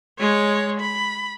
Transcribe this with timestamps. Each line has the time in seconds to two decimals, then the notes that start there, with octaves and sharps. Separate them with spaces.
0.19 G#3 C#5
0.80 B5